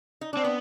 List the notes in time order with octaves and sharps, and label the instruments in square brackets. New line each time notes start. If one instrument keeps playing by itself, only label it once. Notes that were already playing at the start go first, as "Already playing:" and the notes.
[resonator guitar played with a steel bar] D#4
[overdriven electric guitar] C4 [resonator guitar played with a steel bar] D4
[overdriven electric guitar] B3 [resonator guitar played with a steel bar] C4